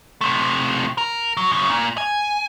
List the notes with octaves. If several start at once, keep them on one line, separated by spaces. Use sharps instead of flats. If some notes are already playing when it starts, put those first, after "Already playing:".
C3 A3
A#4
F#3
F#2 C#3
A#2
G#5